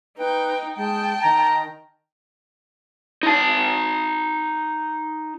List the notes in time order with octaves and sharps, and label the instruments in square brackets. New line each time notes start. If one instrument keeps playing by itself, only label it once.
[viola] D#4 G5 [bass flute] B4
[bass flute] G#3 [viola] G5 A5
[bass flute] D#3 [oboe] A#5
[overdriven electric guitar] D#4 A5